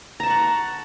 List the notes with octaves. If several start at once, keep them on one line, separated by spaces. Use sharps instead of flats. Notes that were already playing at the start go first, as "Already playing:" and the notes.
F#5 A5 A#5 C#6